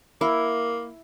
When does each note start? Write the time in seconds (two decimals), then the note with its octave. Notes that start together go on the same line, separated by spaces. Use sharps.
0.21 A#3 E4